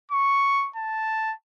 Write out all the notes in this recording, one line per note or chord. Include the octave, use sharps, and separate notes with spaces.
C#6
A5